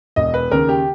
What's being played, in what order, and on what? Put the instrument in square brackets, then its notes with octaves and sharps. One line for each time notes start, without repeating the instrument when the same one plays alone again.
[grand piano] E1 D#5
B4
D#2 C#3 A#4
G4